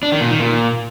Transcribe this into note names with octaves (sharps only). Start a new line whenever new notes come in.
D4
D#3
A#2
D#3
A#2